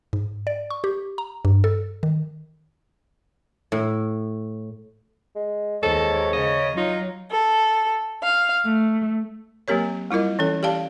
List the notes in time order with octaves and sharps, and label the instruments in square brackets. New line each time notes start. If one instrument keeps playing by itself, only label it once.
[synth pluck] G#2
D5
C#6
G4
A#5
G2
A4
D#3
[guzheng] A2
[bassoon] G#3
[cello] D#2 [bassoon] G#2 [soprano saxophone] A4 [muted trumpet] C#5
[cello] C#3 [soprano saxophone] D#5
[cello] F#3 [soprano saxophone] D#4 [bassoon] F4
[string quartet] A4
F5
A3
[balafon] F#3 A#3 C4 G4 A#4 C#5
G3 E4 F4 A#4 D#5
E3 C#4 A4
G4 D5 F5 A5